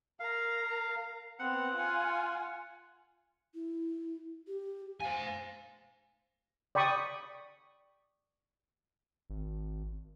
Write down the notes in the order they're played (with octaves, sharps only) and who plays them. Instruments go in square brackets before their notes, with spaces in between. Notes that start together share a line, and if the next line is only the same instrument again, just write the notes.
[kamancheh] A#4 A#5 [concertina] F5
[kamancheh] B3 C4 [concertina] F#5
[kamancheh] F4 G#5
[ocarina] E4
G4
[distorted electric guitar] C5 G#5 [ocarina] F5
[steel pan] D5 G5 B5 C#6 D#6
[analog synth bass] G#1